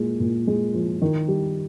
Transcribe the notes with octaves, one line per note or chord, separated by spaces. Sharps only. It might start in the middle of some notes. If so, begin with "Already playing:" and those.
Already playing: A#2 G#3
A#2
G#3
F3
D#3
G3